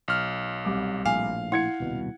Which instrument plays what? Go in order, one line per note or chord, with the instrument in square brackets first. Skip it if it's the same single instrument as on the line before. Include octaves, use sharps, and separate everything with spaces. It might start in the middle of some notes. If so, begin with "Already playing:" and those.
[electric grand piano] B1 F6
[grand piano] C2 D6
[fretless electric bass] A#1 A2 [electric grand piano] F5 [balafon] G#5
[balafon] E4 [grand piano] F#5 G#6 C#7
[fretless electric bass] D#1 C2 B2